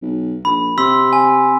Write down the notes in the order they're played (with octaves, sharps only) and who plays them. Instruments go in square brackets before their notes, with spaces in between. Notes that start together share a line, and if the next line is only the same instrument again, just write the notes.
[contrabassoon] B1
[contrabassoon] A#1 [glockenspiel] B5
[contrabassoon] C3 [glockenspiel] C6 E6 B6
[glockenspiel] G#5